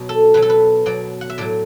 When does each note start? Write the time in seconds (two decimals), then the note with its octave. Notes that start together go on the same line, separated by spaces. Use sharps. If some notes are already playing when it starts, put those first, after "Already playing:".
Already playing: B2 F#3
0.09 A4
0.34 B2 F#3 B4
0.42 A4
0.50 B4
0.86 B2 F#3 D5
1.21 F#5
1.30 E5
1.38 A2 F#3 D5